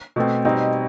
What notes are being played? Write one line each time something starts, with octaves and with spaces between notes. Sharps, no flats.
B2 A3 C4
B2 G3 C4 D#4